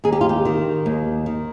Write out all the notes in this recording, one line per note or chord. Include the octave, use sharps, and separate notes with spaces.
D#2 G#4
G4
F4
G4
D#3
D#2
D#3